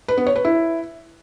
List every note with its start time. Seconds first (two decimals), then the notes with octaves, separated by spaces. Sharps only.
0.08 B4
0.17 B3
0.27 C#5
0.36 B4
0.45 E4